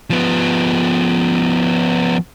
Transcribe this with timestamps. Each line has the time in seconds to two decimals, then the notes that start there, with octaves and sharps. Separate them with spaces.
0.10 F3 B3